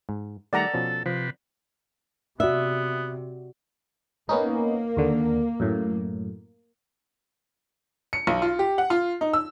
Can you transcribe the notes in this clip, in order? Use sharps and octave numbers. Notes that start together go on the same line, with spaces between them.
G#2
D#3 G3 A3 A4 D5 F#5 A#5
B2 F3 C#4
C3 F3 B4
C3 B3 F#4 D5 E5
A#3 B3 C#4 D#4
D#2 D3
F#2 A2
C#7
B1
F4
G4
F#5
F4
D#4
E6